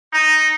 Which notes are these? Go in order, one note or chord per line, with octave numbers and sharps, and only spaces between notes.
D#4